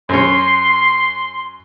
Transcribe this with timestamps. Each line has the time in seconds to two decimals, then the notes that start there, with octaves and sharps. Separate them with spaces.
0.09 F#2 C#4 C6